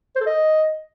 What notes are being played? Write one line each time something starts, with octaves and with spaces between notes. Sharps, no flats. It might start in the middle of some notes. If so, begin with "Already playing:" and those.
C5
A4
D#5